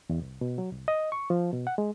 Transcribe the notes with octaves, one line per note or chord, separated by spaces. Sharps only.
E2
C2
B2
F#3
C2
D#5
C#6
F3
B2
F#5
G#3